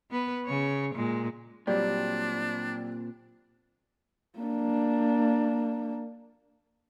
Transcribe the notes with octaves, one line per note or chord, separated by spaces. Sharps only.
B3 B4
C#3 C#5
A#2 G#3
A#2 F#3 G3 C4 D4 G4 D5
A#3 D4